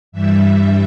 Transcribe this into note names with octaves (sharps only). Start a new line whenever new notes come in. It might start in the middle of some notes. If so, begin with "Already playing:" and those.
G2 E3 G3 E5